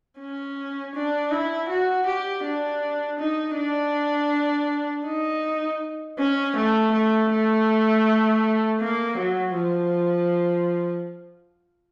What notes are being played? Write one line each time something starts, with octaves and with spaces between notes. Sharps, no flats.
C#4
D4
E4
F#4
G4
D4
D#4
D4
D#4
C#4
A3
A3
A3
A#3
F#3
F3